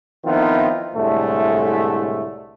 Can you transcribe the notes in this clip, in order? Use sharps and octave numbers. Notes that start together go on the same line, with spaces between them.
D#3 F3 B3 C4 E4 F4
C2 A2 D3 G#3 A3